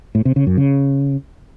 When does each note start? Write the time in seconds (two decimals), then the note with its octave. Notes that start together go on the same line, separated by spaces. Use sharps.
0.15 A2
0.25 C3
0.36 C#3
0.47 F#2
0.57 C#3